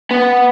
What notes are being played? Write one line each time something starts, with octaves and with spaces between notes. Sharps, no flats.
B3